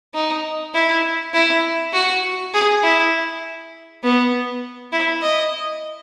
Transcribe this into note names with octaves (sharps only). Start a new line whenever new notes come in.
D#4
E4
E4
F#4
G#4
E4
B3
E4
D#5